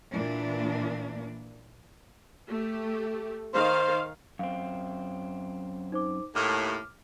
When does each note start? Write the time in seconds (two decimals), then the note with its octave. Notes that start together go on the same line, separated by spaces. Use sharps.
0.12 A#2 E3 A#3 D4
2.50 A3 G4
3.54 D#3 C5 F5
4.39 F#2 C4 F5
5.92 D#4 C5 D6
6.35 D#2 A2 D6 F6